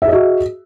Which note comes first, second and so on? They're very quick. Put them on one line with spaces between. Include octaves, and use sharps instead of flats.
E5 G#4 D#5 F#4